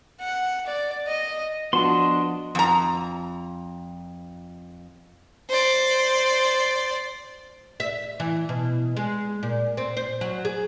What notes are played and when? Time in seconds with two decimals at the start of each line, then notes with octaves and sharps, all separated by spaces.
0.21 F#5
0.67 D5
1.08 D#5
1.73 F3 B3 D4 F#4 D#5 A5 C6
2.55 F2 A#5
5.49 C5 D5
7.80 E5
8.20 E3
8.49 B2
8.97 G#3
9.43 A#2
9.77 C4
9.97 C5
10.21 F#3
10.45 G#4